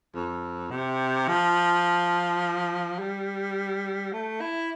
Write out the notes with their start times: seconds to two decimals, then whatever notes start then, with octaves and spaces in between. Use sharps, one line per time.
0.14 F2
0.71 C3
1.28 F3
2.99 G3
4.13 A3
4.41 E4